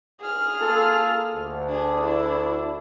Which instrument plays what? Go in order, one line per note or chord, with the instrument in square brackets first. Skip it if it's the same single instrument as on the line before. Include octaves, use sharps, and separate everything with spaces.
[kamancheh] G#4 F6
[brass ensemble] A#3 F4 A4
D2
[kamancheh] D4 G#4
D4 E4